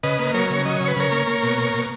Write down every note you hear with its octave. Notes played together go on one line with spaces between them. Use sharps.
C#3 B4 D#5
A#3
F#3 A#4 C#5
C#3
F#3 D#5
C#3 C#5
B4
C#3 A#4 C#5
A#3
A#3
B2
A#3
B2